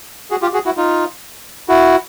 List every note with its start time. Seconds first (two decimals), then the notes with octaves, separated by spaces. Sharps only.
0.31 F#4 G#4
0.42 F4 G4
0.53 F#4 G#4
0.66 E4 F#4
0.77 D#4 F4
1.68 E4 F#4